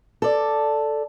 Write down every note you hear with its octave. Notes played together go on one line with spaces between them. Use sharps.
A4 D5